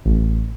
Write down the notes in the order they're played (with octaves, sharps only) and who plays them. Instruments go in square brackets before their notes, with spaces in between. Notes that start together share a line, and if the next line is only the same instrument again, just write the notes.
[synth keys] A1